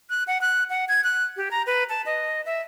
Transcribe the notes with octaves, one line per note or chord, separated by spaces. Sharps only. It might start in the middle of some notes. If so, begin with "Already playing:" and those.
F#6
F#5
F#6
F#5
G#6
F#6
G4
A#5
B4
A5
D#5
E5